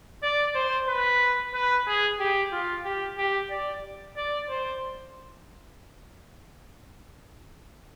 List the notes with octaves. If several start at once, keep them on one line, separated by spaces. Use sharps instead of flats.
D5
C5
B4
B4
G#4
G4
F4
G4
G4
D5
D5
C5